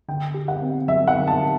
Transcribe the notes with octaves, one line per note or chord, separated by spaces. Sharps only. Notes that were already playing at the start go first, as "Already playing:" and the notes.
D3 G5
G4
F#5
C4
F#3 E5
F#5
D3
A5
G4